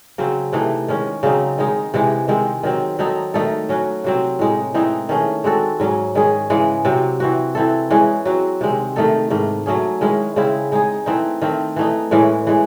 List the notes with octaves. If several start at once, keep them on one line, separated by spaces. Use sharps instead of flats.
C#3 F#3 C4
C3 E3 A3 D#4
D#3 G#3 C#4
C#3 F#3 C4 D#4
D#3 G#3 D#4
C3 E3 G#3
C3 D#3 G#3 C4
D#3 F#3 C4
F#3 C4 D#4 A4
D#3 A3 D#4 A4
F#3 C#4 F#4
C3 F#3 C4
A2 G#3 D#4
E3 C4 D#4
D#3 A3 C#4 G#4
G#3 C4 F#4 A4
G#2 F#3 C#4
D#3 G#3 C#4 G#4
C#3 E3 G#3
C3 F#3 C4 F#4
E3 C4 F#4
E3 C4 E4 A4
E3 G#3 C#4
F#3 C4 F#4
C3 D#3 G#3 C4
D#3 A3 D#4 A4
G#2 D#3 A3
F#3 A3 C#4 G#4
D#3 G#3 C#4 E4
C#3 G#3 C4 E4
G#3 D#4 G#4
E3 A3 C4 D#4
D#3 A3 C4
E3 A3 D#4
A2 E3 G#3 C#4
E3 G#3